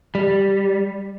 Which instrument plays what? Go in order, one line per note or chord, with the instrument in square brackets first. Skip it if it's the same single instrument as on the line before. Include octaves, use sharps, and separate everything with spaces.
[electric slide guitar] G3